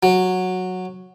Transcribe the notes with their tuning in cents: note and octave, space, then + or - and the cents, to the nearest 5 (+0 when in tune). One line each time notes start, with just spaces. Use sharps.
F#3 -10